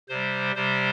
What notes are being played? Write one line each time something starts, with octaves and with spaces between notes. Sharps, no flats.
C3 G3 C5
C3 G3 C5